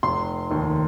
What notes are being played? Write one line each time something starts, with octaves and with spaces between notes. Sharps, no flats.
F1 C6
D#2 D#3